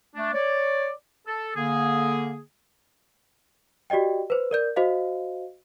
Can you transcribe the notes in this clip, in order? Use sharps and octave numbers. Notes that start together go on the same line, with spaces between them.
A3 D4
C#5 D5
A4
D3 A#3 G#4
F#4 G4 D5 D#5 G5
B4 C5
A#4 D5 G6
F#4 C5 D#5 F5